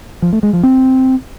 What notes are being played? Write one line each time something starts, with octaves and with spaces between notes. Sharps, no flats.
F3
A3
G#3
F3
C4